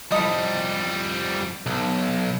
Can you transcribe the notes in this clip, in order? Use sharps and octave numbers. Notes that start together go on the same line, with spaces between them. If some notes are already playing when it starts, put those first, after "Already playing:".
F2 G3 E4 A4 D#5
B1